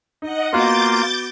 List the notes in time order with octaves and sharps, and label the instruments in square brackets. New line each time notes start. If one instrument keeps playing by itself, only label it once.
[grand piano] D#4 [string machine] D#5 F#5
[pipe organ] A#3 F4 [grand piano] B3 F#4 [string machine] D6 G6 A6